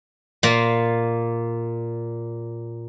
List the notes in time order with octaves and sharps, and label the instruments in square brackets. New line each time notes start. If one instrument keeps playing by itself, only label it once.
[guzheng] A#2 A#3